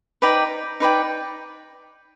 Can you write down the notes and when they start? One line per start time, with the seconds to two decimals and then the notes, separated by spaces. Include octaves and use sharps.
0.22 D#4 B4 D5 G5
0.80 D#4 B4 D5 G5